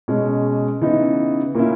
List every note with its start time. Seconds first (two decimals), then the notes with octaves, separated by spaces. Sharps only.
0.08 B2 G#3 C#4
0.81 C#3 E3 B3 D#4
1.55 A#2 A#3 C#4 E4